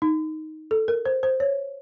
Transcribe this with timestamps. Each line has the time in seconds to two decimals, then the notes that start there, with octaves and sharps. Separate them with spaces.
0.02 D#4
0.71 A4
0.88 A#4
1.06 C5
1.23 C5
1.40 C#5